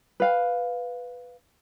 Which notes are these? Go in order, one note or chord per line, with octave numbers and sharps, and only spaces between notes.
B4 F5